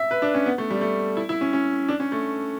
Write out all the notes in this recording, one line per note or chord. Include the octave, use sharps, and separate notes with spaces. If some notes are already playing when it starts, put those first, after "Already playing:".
Already playing: E5
B4
D4
C#4
B3
A3
G3
A3
E4
E4
C#4
C#4
D4
C#4
A3